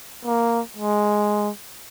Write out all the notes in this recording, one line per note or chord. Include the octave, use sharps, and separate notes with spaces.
A#3
G#3